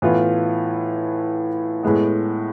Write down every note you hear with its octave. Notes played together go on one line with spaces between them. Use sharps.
A2 E3 B3 F4
A2 G#3 B3